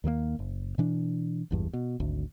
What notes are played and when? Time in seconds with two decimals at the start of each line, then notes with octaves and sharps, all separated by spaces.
0.04 D#2 D#3 F3 A#3
0.39 F#1
0.78 B2 E3 D4
1.51 G#1 E2 G2
1.73 B2
2.00 G#1 D2